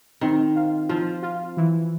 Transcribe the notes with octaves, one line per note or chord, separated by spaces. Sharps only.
D#3 C4
F4
F3 F4
F4
E3